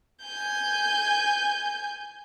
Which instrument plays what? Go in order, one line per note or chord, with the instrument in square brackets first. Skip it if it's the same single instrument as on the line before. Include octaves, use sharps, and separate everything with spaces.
[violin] G#5 G6